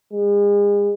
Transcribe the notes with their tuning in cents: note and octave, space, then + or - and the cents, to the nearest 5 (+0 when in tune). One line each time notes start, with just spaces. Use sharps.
G#3 -35